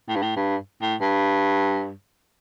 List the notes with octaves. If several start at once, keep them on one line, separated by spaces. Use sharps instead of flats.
A2
G2
A2
G2
A2
G2